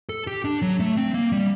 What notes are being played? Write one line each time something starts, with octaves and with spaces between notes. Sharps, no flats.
A4
G4
D4
F#3
A3
C4
A#3
G3